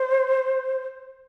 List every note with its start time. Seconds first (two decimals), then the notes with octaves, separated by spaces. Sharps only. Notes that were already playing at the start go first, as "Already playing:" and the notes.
Already playing: C5